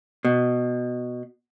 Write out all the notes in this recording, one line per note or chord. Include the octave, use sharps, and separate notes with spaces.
B2